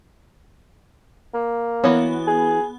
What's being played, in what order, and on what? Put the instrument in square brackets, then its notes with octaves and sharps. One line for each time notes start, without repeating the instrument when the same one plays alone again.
[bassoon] A#3
[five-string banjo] E3 F#4 C#5 [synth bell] B3
[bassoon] G#4